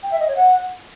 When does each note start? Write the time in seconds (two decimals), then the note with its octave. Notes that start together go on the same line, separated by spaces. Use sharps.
0.03 G5
0.11 E5
0.20 D#5
0.28 C#5
0.36 F#5